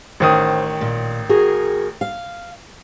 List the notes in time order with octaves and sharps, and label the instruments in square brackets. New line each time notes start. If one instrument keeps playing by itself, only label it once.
[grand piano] A1 D#3 D#6 [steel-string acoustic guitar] C5
[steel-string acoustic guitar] A#2
F#4 G#4 A#4
F5